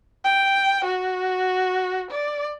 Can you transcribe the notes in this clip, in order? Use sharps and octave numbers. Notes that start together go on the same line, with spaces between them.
G5
F#4
D5